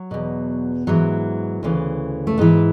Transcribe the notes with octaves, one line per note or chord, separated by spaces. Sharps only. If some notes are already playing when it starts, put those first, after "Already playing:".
Already playing: F#3
E2 B2
G#2 E3 F#3
D2 C#3 E3
A3
G#2 E3 B3